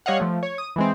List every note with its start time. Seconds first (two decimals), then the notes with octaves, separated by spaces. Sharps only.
0.06 G3 C#5 D#5 F5 F#5
0.20 F3 A3
0.43 C#5
0.58 D#6
0.76 E3 G#3 C4